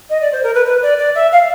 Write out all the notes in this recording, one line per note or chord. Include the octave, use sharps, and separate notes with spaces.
D#5
D5
C5
A#4
B4
B4
D5
D5
E5
F5